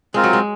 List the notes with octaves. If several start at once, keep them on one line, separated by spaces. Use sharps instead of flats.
G#3 C4 F4 A#4
F#3
G#3